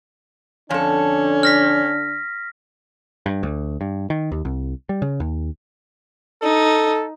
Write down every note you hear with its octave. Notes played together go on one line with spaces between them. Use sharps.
F2 D3 C#4 D4 A4
F6 A#6 B6
G2
D2
G2
D#3
D#2
C2
G3
C#3
D#2
D#4 A4